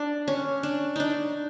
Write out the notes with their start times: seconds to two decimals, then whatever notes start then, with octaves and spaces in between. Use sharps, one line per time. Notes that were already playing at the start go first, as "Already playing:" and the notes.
Already playing: D4
0.28 C#4
0.63 D4
0.96 D4 D#4